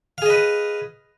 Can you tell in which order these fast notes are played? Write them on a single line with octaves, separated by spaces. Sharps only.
F5 G#4 D#5 B4